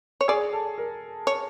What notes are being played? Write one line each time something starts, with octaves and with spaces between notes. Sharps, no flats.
C#5
G#4 D5
A4
A#4
C#5